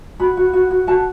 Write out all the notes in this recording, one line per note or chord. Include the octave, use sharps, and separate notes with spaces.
F#4 B5
F#4
F#4
F#4
F#4 A5